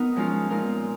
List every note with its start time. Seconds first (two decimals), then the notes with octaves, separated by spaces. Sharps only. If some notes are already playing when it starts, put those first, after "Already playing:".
Already playing: B3 D#4 A#4
0.16 F3 G#3 C#4 F4
0.50 A#2 G#3 D#4 A#4